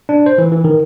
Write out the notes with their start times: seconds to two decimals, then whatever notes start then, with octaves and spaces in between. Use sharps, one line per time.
0.09 D4
0.26 C5
0.38 E3
0.52 E3
0.64 D#3